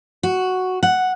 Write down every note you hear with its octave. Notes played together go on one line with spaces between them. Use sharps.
F#4
F#5